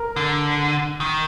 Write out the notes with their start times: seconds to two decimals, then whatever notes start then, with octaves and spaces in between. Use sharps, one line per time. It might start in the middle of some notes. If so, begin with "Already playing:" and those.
Already playing: A#4
0.16 D3
1.01 D#3